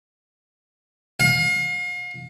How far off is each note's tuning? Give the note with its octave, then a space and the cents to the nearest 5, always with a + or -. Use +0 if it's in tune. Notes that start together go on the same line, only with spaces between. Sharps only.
F5 +40